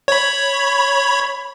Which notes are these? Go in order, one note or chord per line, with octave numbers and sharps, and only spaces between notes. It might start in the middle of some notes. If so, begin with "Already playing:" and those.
C#5 B5